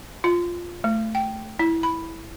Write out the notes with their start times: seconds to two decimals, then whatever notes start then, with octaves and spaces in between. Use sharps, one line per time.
0.24 F4
0.84 A3
1.15 G5
1.59 E4
1.83 B5